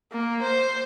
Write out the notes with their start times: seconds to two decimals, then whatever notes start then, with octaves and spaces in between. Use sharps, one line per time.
0.12 A#3
0.43 C5